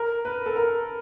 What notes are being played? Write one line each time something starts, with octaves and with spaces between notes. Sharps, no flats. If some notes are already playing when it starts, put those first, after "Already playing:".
Already playing: A#4
B4
A4
A#4